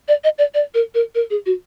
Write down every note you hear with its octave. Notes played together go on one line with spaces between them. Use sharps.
D5
D#5
D5
D5
A#4
A#4
A#4
G#4
F#4